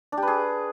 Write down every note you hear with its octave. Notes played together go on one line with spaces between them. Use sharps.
D4
G4
B4
G#4